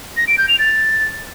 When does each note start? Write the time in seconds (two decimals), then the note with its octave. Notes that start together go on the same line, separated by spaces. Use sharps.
0.17 A#6
0.27 D7
0.38 G6
0.48 F7
0.59 A6